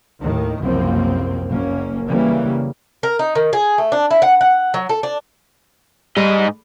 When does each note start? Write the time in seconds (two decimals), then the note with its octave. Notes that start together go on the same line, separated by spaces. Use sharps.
0.20 D#2 A2 D#3
0.60 F#1 C2 F#2 F3 A#3 C4
1.48 F#1 A#3 C#4
2.07 C#3 E3 G3 A#3
3.03 A#4
3.19 D#4
3.35 D#3
3.53 G#4
3.78 A3
3.92 D4
4.11 E4
4.22 F#5
4.41 F#5
4.74 F#3
4.89 A4
5.03 D4
6.17 G#2 G3 D#5